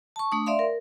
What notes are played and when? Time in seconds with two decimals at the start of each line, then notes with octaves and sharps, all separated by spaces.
0.16 A5 C#6
0.32 A3 D4 D#6
0.46 D5 E5 F5 C6
0.59 A#4